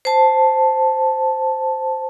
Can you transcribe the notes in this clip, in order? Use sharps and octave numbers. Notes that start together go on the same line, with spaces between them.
C5 A5